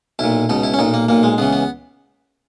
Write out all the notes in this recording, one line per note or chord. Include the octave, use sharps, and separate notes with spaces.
B1 A#2 E4
C#2 B2 D#4
E4
C#4
B1 A#2 D#4
A#3
B1 A#2 A#3
G#3
C#2 C#3 E3 B3
B3